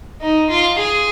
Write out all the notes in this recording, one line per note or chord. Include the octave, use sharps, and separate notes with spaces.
D#4
F4
G#4